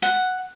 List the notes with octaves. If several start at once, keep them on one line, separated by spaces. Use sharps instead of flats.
F#5